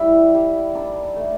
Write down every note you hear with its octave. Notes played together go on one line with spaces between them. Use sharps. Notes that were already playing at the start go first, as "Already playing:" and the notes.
Already playing: G3 E4
G3
D#3 D4
A3